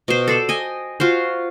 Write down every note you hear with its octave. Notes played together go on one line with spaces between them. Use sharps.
B2 C5
A4 C5 D5
D#5 G5 G#5
F4 F#4 C5